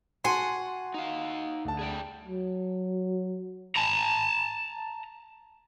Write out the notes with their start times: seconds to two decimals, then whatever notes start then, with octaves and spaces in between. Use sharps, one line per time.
0.24 F#4 F#5 G#5 A5 C6
0.94 D#4 F5
1.65 D2 A5
1.79 G#4 D5 G5
2.25 F#3
3.77 A5 A#5